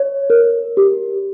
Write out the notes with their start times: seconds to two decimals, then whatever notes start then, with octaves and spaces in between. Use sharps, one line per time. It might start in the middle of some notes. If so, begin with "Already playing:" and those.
Already playing: C#5
0.30 A#4
0.77 G4